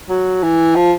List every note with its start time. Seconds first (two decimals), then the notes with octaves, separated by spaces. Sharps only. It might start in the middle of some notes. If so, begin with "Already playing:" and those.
0.09 F#3
0.43 E3
0.75 F3